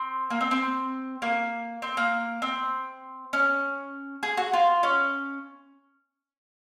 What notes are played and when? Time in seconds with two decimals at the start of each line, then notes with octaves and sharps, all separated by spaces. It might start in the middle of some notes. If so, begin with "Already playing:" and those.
Already playing: C4
0.30 A#3
0.41 C4
0.51 C4
1.22 A#3
1.82 C4
1.97 A#3
2.42 C4
3.33 C#4
4.23 G#4
4.37 F#4
4.53 F4
4.83 C#4